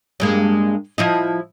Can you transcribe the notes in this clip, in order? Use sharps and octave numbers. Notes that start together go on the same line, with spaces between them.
G2 G#3 A#3
F3 E4 D#5